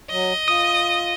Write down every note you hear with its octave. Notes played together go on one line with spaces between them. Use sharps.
F#3 D#5
F4 D#6